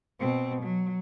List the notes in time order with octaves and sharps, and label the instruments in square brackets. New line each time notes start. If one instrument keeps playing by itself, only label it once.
[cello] B2 C4
F#3